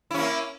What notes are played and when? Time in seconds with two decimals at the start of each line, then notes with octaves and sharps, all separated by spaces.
0.11 E4
0.14 C#4
0.18 A#3